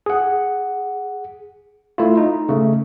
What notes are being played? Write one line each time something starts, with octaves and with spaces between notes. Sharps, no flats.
G#4 F#5
A3 E4 F4
D#4
C#3 A3